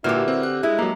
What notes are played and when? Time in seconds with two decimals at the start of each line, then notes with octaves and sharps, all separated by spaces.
0.04 A#2 D3 E4 F#4 G4 A#4 B4 F6
0.28 C4
0.43 F#6
0.63 G#3 D4 E4
0.79 F#3 A#3 G4 E5 A#5